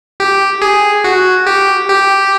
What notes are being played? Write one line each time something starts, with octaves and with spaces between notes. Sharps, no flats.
G4
G#4
F#4
G4
G4